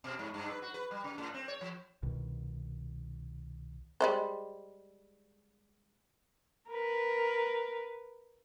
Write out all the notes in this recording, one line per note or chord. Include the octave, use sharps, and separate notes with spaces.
B2
G#2
G2
B4
F#4
B4
G3
C#3
A2
C4
C#5
F3
C2 B2 D#3
G3 G#3 C5
A#4 B4